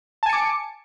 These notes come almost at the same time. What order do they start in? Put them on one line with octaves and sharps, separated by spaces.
A5 G#5 C#7 D6